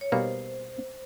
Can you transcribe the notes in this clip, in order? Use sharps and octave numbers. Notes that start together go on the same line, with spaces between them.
C#5
B2 G3 A#3 D#4 C5